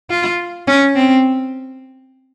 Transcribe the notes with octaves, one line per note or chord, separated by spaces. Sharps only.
F4
C#4
C4